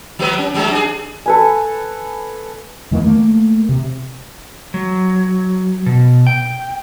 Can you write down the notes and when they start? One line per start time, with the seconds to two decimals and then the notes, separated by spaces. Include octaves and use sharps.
0.19 F3 G3 B4
0.38 C#4
0.54 F3 G3 G#3
0.71 D4 G#4
1.26 A4 B4 G#5
2.91 F2 D#3 E3 A#3
3.04 A3 A#3
3.69 C3
4.74 F#3
5.86 B2
6.27 G5